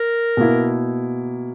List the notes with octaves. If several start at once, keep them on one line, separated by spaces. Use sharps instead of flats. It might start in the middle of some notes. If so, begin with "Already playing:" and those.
Already playing: A#4
B2 A#3 E4